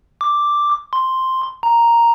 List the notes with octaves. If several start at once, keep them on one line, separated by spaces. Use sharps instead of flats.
D6
C6
A#5